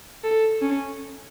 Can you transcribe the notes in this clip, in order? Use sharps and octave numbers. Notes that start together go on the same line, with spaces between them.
A4
C#4